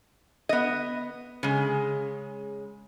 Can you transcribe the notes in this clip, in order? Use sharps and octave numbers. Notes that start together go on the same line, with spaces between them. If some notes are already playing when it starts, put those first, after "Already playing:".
B3 D#5
C#3 G#3